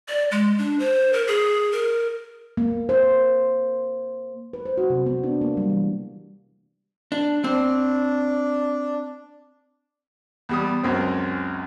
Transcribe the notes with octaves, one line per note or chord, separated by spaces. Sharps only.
D5
G#3
D4
C5
A#4
G#4
A#4
A#3
C5
B4
C5
F#4
C3
B3
D4
A#3
G3
E3
D4
C4 D4
E2 G3 D#6
C#2 F#2 C4